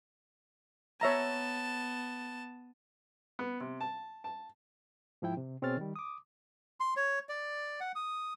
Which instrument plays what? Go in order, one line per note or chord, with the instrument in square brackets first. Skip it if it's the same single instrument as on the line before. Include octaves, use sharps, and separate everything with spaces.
[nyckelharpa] B3 A5 [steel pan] C#5 E5 A#5
[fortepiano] B3
C3
A5
A5
[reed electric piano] G#2 F3 E4 G5
C3
B2 C4 G#4 C#5 F6 A6
D#3 G3
D6 D#6
[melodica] C6
C#5
D5
F#5
D#6